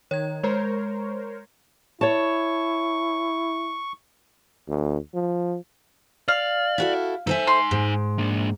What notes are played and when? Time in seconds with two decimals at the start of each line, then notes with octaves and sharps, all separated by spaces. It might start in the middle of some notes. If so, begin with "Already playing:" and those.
0.11 D#3 C#5 G#6
0.43 G#3 A#4 C5 C#5
2.01 E4 C#5 A5 C#6
4.68 D2
5.14 F3
6.28 D5 F5
6.78 E4 F#4 A4
7.27 D#4 A4 C5 E5 G#5
7.47 C6
7.71 G#2
8.18 A#3 D4